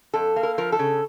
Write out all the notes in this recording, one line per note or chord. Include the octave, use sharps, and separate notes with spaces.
F2 A4
A#3
A#4
F3 A#4
A4
C#3